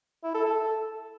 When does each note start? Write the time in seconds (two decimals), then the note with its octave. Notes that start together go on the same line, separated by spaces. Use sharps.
0.24 E4
0.35 A4
0.45 A4